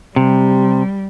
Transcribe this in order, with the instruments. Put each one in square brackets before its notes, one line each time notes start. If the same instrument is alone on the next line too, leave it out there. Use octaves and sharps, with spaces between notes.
[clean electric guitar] C3 [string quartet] G3